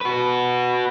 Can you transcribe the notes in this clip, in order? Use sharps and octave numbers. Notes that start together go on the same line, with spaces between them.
F#4 B4